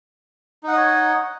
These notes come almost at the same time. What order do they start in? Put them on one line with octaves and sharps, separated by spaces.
D#4 F#5 D#5 C#5